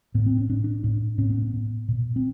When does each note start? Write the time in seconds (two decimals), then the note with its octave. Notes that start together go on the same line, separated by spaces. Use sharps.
0.14 A2 B3
0.26 C4
0.37 C#4
0.49 A2 D4
0.64 D4
0.84 A2 D4
1.18 A2 C#4
1.30 B3
1.42 B3
1.53 A2
1.88 A#2
2.16 C4